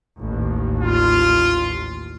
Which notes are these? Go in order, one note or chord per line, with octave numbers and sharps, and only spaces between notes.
A1 D#2
F4